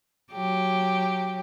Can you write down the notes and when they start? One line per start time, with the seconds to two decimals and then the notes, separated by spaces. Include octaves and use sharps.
0.33 F#3 G4